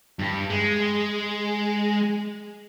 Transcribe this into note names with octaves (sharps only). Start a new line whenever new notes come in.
G2
G#3